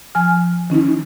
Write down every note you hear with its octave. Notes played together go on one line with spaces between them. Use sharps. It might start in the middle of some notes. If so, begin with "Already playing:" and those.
F3 G#5 F6
D#3 C#4 D#4 E4